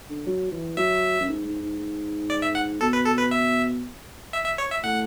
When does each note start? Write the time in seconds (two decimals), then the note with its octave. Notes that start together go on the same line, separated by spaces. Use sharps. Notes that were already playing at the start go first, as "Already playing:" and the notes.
0.09 D3
0.27 F#3
0.52 E3
0.77 F#3 E5
1.20 F#2
1.28 G#2
1.45 G#2
1.62 G#2
1.79 G#2
2.30 D5
2.42 E5
2.55 F#5
2.80 B2 A4
2.93 B4
3.06 A4
3.18 B4
3.31 E5
4.33 E5
4.45 E5
4.58 C#5
4.71 E5
4.83 A2 F#5